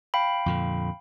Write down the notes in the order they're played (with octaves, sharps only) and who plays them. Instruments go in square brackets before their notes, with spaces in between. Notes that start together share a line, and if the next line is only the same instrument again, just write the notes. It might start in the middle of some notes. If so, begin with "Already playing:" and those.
[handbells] F5 G5 B5
[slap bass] F2 A#2 D3